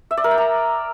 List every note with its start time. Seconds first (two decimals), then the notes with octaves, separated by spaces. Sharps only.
0.11 E5
0.17 D5
0.24 A#4
0.31 G5
0.38 A#5